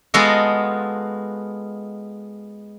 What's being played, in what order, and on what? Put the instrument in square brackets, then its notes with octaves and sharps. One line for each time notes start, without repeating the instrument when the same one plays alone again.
[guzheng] G#3 B3 F4 F#4 A4 D#5